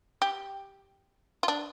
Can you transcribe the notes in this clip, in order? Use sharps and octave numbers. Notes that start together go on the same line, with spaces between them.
G4
F4
D4